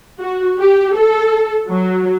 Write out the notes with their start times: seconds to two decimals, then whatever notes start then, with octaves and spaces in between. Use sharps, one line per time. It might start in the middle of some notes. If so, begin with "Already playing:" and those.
0.19 F#4
0.59 G4
0.96 A4
1.70 F#3